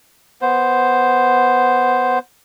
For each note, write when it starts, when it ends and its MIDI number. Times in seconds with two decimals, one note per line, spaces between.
0.42 2.19 59
0.42 2.19 72